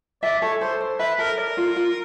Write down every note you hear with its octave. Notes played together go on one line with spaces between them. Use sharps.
D5 E5
A4 C#5
A4 C5
C5
B4 E5
A4 A#4
A#4 D5
F4
F4